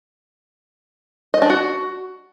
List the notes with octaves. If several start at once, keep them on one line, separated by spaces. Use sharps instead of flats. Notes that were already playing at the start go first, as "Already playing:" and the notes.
D#5
D4
F#4